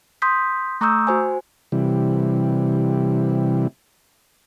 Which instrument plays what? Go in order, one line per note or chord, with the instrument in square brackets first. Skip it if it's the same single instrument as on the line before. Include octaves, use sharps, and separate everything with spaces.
[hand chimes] C6 D#6 G6 B6
A3 A#5 C#6 D#6 E6 G6
F#4 C5 G#5
[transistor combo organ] C3 E3 G3